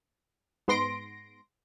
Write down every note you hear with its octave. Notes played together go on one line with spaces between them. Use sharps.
G#2 B3 C6 A#6 D7